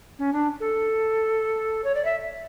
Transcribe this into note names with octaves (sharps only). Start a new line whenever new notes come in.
C#4
D4
A4
C#5
D5
E5